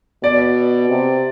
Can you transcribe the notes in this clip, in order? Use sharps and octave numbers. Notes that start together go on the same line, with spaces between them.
B2 D5
C3